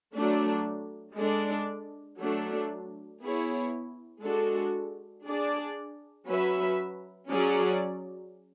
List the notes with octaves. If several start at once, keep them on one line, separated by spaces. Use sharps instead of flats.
F#3 A3 D4
G#3 D4 A4 D5
F#3 A3 D4
B3 E4 G#4 C#5
G#3 D4 F#4 A4
D4 G#4 D5
F#3 C#4 F#4 B4 E5
F#3 C#4 G#4 D5